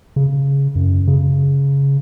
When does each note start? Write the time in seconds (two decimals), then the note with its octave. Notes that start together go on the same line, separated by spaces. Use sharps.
0.16 C#3
0.76 F#2
1.07 C#3